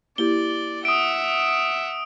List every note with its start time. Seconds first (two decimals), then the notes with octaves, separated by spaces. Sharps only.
0.18 A#3 E4 G4 D5 G7
0.85 E5 F#5 D#6 D7